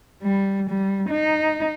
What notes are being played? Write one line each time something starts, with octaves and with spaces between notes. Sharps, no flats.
G3
G3
D#4